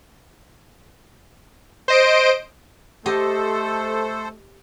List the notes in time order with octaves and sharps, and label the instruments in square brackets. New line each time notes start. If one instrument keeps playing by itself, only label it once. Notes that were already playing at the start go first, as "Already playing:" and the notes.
[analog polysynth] C5 D#5 D7
[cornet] A3 [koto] G4 D#5 [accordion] A4 C5